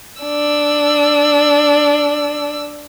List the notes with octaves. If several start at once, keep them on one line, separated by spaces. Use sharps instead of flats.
D4 E6